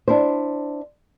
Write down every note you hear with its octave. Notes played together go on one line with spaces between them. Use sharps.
D4 E4 C5